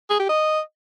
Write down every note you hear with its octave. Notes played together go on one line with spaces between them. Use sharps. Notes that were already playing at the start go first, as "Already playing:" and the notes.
G#4
G4
D#5